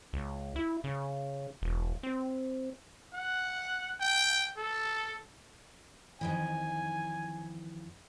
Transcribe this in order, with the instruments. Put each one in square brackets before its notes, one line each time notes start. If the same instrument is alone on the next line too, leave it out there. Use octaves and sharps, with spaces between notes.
[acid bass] C#2
E4
C#3
E1
C4
[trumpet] F#5
G5
A4
[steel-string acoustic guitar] F2 D#3 E3 [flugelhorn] G#5